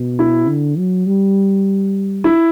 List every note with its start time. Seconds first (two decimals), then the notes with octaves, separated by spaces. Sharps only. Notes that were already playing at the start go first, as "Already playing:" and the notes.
Already playing: B2
0.19 E4
0.48 D3
0.78 F#3
1.07 G3
2.24 E4